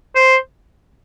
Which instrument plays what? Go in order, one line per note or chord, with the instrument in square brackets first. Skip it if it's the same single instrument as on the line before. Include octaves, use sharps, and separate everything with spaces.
[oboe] C5